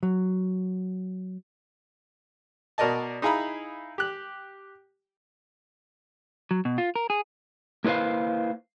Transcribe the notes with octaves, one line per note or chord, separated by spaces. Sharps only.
F#3
B2 F#4 A#4 D5 D#5 A5
D#4 E4 G#4 F5 A#5 B5
G4 F#6
F#3
B2
F4
A#4
G#4
A#3 E4 B4 C5 F5